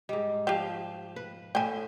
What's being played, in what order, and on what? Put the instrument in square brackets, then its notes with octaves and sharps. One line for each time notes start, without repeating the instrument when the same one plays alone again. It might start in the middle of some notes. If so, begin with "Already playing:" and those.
[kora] G#2 G3 [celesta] D#5
[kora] F3 E5 F5 [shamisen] G4 G5 [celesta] E7
[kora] B4
[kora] A2 E5 [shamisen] G5 G#5